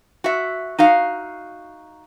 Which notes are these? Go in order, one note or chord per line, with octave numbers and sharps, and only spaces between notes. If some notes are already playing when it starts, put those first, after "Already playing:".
F#4 E5
D#4 F#4 F5